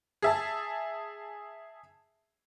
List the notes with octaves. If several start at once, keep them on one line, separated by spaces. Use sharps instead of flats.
G#4 E5 A5